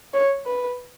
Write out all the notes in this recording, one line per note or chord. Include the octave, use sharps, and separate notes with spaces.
C#5
B4